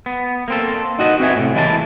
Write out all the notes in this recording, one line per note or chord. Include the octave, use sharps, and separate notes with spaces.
B3
A#3 C4 A4
D#4 F#4 D#5
C4 F#4 B4 E5 F#5 G#5
A2 C3
E3 G#3 A#3 E4 G#5 A5